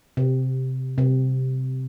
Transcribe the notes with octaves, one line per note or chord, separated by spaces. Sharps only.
C3
C3